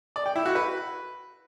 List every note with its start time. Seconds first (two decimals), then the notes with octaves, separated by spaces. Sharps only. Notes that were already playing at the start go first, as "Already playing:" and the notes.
0.16 D5
0.26 G5
0.36 E4
0.45 F#4
0.55 B4